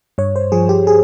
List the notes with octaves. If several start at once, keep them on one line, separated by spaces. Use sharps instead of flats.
G2 C#5
C5
F3 G#4
G4
G#4